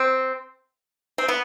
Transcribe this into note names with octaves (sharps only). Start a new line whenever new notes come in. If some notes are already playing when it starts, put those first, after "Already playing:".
Already playing: C4
C4
B3